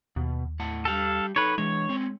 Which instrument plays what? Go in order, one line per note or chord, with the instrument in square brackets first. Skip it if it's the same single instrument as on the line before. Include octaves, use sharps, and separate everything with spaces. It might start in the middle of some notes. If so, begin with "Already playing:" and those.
[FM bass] D#2 [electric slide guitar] B2
[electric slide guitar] A2 F#5 A5
[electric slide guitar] G3 G4 A5 [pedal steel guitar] A4 F5
[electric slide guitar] D#4 A4 [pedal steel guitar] B4 C#5
[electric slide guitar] E3 D4 [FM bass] G#3 [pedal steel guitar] C#5
[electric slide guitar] C4 C#4